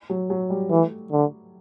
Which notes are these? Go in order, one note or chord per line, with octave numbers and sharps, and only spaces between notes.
F#3
F#3
G3
E3 A3
D3